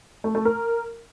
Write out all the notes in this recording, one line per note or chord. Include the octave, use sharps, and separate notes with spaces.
A3
A3
A#4